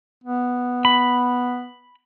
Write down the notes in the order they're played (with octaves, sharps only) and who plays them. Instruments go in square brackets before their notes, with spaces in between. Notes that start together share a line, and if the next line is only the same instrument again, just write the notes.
[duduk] B3
[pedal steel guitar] B5